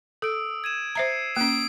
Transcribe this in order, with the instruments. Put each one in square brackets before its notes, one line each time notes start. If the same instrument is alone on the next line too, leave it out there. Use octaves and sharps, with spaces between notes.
[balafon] A4 [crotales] D#6 E6 D7
[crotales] G#6 D#7 E7
[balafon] C5 E5 A#5 [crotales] G#6 C7 C#7
[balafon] A#3 C#4 [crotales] D#6 [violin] D7